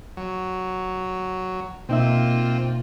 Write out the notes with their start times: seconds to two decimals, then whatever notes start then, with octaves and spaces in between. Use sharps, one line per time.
0.17 F#3
1.89 B2 A#3 C4 D#4 F4 E5